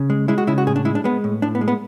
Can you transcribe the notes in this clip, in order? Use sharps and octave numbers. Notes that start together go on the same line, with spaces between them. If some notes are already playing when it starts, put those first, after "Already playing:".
Already playing: C#3
G#3
G#3 E4
F#4
C#3 E4
F#4
A2 G#4
D4
G#3 E4
D4
G#3 B3
A2
A2 D4
B3
G#3
B3